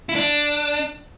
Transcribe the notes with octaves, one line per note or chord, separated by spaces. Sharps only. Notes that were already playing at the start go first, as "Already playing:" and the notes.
E4
D4